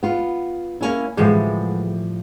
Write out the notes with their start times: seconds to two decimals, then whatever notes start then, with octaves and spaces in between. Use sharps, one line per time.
0.03 B3 F4
0.81 A#3 C#4 E4
1.17 A2 F3 G3 G#3 B3